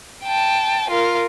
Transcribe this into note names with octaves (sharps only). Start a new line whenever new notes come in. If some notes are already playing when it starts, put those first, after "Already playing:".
G5 A5
F4 A#4